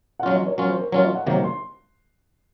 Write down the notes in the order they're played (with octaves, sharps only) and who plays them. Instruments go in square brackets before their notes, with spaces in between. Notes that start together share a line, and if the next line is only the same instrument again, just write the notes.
[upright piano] F#5
[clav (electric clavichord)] F#3 C#4 F4 [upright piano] F5
[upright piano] D#5
C#5
[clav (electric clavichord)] F#3 C#4 F4 [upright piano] A#4
[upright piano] C5
A#4
[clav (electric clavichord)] F#3 C#4 F4 [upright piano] C#5
[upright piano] D#5
F#5
[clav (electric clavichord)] C3 D#3 F#3 A#3 [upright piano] A#5
[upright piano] C6